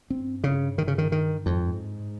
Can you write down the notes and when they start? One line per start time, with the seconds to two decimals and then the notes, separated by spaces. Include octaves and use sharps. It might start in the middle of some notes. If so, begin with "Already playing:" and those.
0.10 G2 C4
0.44 C#3
0.78 D#3
0.88 C#3
0.98 D#3
1.12 D#3
1.46 F2 G#2